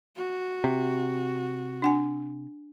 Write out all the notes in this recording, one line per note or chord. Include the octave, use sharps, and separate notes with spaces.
F#4
C3
D4 F#5 G#5